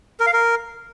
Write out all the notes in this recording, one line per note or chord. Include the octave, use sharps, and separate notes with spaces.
A#4
F5
A#4